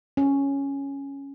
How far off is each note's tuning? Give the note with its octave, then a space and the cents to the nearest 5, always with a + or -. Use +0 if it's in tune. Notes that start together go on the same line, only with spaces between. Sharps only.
C#4 +0